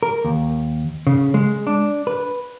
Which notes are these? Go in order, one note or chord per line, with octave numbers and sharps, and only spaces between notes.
A#4
D#2
C#3
G#3
D4
B4